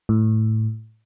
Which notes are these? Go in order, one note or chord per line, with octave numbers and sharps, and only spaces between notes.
A2